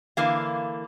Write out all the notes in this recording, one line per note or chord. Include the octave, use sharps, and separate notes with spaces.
D3 E3 A#3 F5